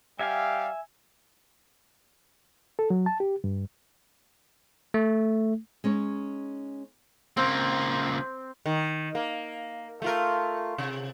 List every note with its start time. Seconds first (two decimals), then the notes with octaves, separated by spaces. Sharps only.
0.19 G3 G4 E5 F5 G#5
2.79 A4
2.90 F#3
3.06 A5
3.20 G4
3.44 G2
4.94 A3
5.84 G#3 C#4 D#4 C#5
7.37 C#2 A#3 C4
8.66 D#3
9.15 A#3
10.02 A3 F4 A#4
10.78 C3